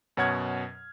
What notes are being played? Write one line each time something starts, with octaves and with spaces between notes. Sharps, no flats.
F#2 B2 C#5 F#5 F6 G#6